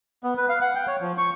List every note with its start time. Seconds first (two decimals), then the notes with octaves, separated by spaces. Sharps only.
0.24 B3
0.37 B4
0.49 F5
0.61 F#5
0.75 G5
0.87 C#5
1.01 F3
1.18 C#6